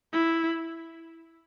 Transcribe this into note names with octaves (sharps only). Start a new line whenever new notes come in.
E4